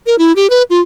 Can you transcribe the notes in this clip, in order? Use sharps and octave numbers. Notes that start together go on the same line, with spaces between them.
A#4
E4
G4
B4
F4